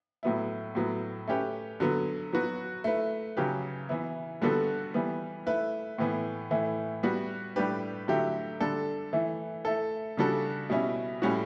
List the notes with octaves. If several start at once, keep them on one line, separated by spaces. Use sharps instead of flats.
A2 F#3 B3 E4
A2 F#3 B3
A3 C#4 G4 B4
D3 F#3 B3
F#3 B3 F#4 B4
A3 E4 B4
C#3 F#3 C#4 G4 B4
E3 B3 E4
D3 G3 B3 F#4 A4
E3 G3 B3
A3 E4 B4
A2 E3 B3
A2 E3 A3 E4
G3 B3 F#4
A2 G3 D4 G4 B4
D3 F#3 A3 E4 G4
D3 G3 D4 A4
E3 A3 E4
A3 E4 A4
C#3 G3 D4 F#4 A4
B2 G3 C#4 E4
A2 G3 C#4 F#4